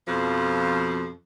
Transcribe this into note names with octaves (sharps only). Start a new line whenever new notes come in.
F2 B2 F3